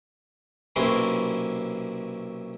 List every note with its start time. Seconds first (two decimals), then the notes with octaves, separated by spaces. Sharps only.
0.76 B1 C3 A#3 C#4 E4 C6